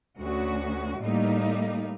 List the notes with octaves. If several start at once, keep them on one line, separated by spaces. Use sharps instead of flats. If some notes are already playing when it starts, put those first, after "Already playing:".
D2 C#4 F#4
A2 G3 A3 A#3 D#4